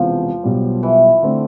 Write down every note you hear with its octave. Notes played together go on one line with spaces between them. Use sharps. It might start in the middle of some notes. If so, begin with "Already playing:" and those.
Already playing: E1 E2 C3 E3 F3
B1 B2 G3
E3
D3 A3 C4